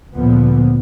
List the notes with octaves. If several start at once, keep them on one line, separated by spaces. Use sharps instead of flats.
D2 A#2 D3 F3 B3